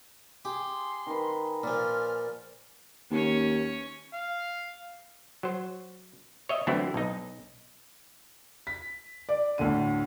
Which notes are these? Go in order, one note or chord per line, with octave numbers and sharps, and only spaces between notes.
G4 G#4 C6
D#3 B4
A#2 F3 D5 F6
D#2 C#4 C#5
F5
F#3 C5
C#5 D#5 E5
D3 E3 F#3 A3 C4 E4
B1 D#4
B6
D5
D2 A2 D3 D#7